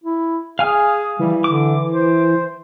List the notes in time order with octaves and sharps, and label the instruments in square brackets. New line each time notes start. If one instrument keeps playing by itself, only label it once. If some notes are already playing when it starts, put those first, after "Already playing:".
[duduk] E4
[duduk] G#4 [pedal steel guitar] F5 G#5 F6
[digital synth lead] E3 [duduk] G3
[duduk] D3 [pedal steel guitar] D6
[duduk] C5